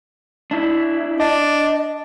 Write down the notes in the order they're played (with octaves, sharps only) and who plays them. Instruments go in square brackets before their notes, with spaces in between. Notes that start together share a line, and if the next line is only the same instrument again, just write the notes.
[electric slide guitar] D4 E4
[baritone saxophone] D4 [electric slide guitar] D#5